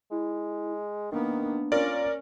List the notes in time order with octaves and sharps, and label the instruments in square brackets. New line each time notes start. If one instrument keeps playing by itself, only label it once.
[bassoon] G#3 [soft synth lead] E4
[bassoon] D#3 [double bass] A#3 B3 [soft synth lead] D4
[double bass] C#4 [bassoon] F4 [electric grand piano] A#4 D5